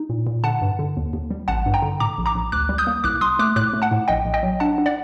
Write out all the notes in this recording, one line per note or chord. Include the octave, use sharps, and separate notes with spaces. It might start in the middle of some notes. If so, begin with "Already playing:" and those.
Already playing: D#4
A#2
A#2
D3 F#5 A5
G2
D3
D#2
D#2
G3
A1 F#5 A5
G2
G5 A#5
D3
A2 A#5 D6
A#1
A#5 D6
A#1
D2 D6 F#6
G3
D#6 G6
A#3
C2 D6 F#6
C2 C6 D#6
A3 D6 F#6
A2 D6 F#6
A3
F#5 A5
A2
A#1 D#5 G5
A#1
D#5 G5
F#3
D4 F#5 A5
D4
D5 F#5